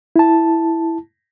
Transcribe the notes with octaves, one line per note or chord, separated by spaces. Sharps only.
E4 A5